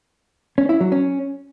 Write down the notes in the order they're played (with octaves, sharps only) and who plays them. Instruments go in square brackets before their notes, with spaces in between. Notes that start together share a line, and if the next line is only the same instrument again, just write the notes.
[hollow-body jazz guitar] C#4
E4
F#3
C#4